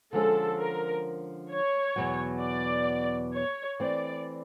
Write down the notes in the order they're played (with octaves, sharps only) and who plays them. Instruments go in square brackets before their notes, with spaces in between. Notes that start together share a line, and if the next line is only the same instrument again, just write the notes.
[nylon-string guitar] D3 F3 G#3 C#4 [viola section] A4
[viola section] A#4
C#5
[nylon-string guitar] E2 B2 F#3
[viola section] D5
C#5
[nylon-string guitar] E3 A3 C4 [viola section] D5